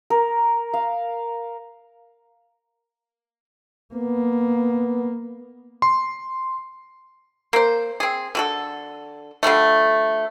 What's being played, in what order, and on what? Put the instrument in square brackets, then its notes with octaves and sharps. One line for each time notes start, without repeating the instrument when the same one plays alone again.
[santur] A#4
F5
[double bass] A#3 [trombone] B3
[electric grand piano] C6
[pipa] A#3 C5
C4 G#4
D3 F#4 A4
D3 F3 G3 A3